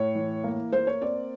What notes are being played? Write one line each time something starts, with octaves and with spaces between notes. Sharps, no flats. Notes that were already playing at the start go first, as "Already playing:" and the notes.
Already playing: A2 C#5
E3
A#3
A#3 C5
C#5
C4 D5